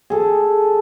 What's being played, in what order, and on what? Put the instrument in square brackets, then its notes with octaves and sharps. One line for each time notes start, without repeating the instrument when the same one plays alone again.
[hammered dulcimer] G#4 A4